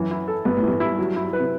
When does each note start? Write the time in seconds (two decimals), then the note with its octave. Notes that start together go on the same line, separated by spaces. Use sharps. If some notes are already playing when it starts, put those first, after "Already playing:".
Already playing: F#2 E3
0.11 E4
0.28 A4
0.45 G2 B3
0.57 A2
0.63 G2 E3
0.80 E4
0.99 F#3
1.16 E4
1.33 B4
1.39 C3